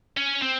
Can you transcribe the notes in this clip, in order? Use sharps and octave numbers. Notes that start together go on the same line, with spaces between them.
C#4
C4